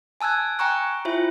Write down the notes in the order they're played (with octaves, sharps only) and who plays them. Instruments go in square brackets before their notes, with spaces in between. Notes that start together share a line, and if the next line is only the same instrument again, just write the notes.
[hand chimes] G#5 A5 E6 F#6 G#6
G5 G#5 A#5 C#6 F#6
E4 F4 C5 E5